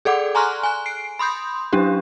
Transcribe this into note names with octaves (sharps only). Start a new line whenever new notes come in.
G#4 A4 D5 F#5 D6
G#5 A#5 C6 C#6 F6 F#6
G#5 F#6
C7 D7
B5 C6 D#6 G6
F#3 C#4 D4 G4